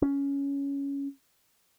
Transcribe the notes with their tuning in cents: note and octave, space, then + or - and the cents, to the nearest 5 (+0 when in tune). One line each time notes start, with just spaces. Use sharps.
C#4 +10